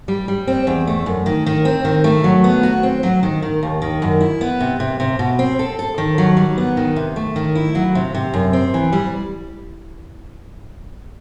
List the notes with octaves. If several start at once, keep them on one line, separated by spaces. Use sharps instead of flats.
G3
G3
C4
E2
A3
F#2
D#3
D#3
C4
D#3
A3
F#3
B3
F#4
C4
F#3
D#3
D#3
D#2
D#3
F#2
E4
B3
C3
C3
C3
B2
C4
A4
A4
D#3
F#3
G3
B3
D#3
C3
A3
D#3
E4
F#3
C3
C3
F#2
C4
E3
G3